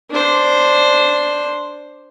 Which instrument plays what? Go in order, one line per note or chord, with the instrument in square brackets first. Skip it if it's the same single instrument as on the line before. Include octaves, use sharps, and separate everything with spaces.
[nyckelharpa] D4 C5